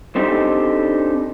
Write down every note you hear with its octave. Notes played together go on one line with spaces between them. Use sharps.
C4 D4 D#4 G4 A4 C5